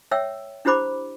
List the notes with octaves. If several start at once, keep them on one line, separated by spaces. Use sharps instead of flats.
C#5 E5 G5 E6
D4 E4 G4 C5 B5 D6